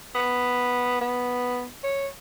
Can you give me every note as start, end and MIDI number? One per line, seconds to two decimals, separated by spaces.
0.15 0.98 59
1.01 1.67 59
1.84 2.07 73